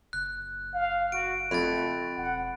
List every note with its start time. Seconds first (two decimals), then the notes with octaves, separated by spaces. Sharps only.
0.13 F#1 F#6
0.74 F5
1.12 F#4 D7
1.51 F2 A3 B5 A6
2.17 E1 F#5